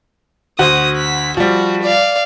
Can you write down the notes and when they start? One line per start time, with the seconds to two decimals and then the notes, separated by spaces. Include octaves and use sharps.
0.59 D2 F#4 C5 D#6
0.98 B6
1.37 F3 G3 F#4
1.83 D5 F5